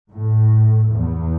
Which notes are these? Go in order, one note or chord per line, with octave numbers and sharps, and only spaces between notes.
A2
E2